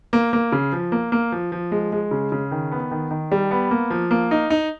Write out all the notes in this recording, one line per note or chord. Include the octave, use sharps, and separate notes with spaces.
A#3
A#3
C#3
F3
A#3
A#3
F3
F3
G#3
G#3
C#3
C#3
D#3
B3
D#3
D#3
G3
B3
A#3
F3
A#3
D#4
D#4